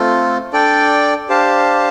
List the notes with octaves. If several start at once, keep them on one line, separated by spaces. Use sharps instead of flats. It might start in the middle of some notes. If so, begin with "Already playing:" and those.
Already playing: A3 C4 F4 A4
D4 A4 D5 G5
D4 G4 C5 F5 A5